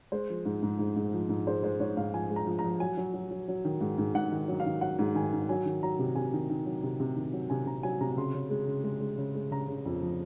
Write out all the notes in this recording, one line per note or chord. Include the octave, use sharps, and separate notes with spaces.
G#3 C5
F3
G#2
G#2
G#2
G#2
F3
G#2
G#3 C5
G#3 C5
G#2 C#5
G#2 F5
F3 G#5
G#3
A#5
F3
A#5
F3
F#3 G#5
F#3
F#3
F#3
F#3
D#3
G#2
G#2
G#2 F#5
D#3
F#3
F5
D#3
F#3 F#5
G#2
D#3 G#5
D#3
F#3 G#5
D#3
F#3 A#5
C3
C3 G#5
D#3
D#3
F#3
C3
C3
D#3
F#3
C3 G#5
C3 A#5
F#3 G#5
C3 A#5
C#3 C6
C#3
G#3
C#3
G#3
G#3
C#3
G#3
C#3 A#5
C#3
F2
F3